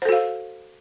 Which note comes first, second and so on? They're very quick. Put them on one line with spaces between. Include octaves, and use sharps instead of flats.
C5 A4 F#4 F5